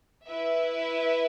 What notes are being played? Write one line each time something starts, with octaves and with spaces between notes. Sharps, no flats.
E4 B4 E5